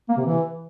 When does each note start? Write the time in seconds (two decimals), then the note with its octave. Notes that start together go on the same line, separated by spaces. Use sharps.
0.09 A#3
0.17 C3
0.25 E3